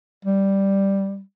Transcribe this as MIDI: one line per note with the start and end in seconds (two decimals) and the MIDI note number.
0.25 1.21 55